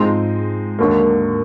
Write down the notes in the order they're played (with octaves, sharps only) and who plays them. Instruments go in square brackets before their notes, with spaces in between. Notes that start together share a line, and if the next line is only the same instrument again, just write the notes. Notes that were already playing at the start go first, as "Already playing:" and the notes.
Already playing: [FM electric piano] G#2 [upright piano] F3 G#3 C4 D#4
[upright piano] D#2 D3 F#3 A#3